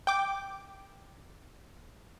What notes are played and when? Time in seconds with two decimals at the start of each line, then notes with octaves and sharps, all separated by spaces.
0.07 G5 D6